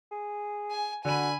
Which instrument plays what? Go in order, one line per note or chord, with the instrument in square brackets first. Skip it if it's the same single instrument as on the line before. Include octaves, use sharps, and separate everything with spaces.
[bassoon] G#4
[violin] G#5
[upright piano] D3 D#7 [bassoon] F#4 [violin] G#5 B5